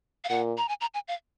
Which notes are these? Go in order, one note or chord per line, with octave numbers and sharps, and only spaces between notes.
F5
A#2 F#5
A#5
G#5
A#5
G#5
F5